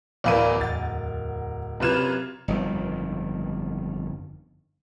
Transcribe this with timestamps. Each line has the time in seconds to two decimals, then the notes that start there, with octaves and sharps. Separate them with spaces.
0.24 D1 E2 E3 A#4 D5 F5 B5 D#7
0.61 E2 F#5 A6
1.80 F#2 C3 F4 B4 G#6 E7
2.48 G1 F2 D#3